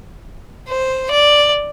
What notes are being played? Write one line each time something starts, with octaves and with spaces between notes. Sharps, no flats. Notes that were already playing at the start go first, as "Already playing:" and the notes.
C5
D5